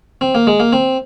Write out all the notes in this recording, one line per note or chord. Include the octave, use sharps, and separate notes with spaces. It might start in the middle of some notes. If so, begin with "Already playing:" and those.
C4
A#3
G#3
A#3
C4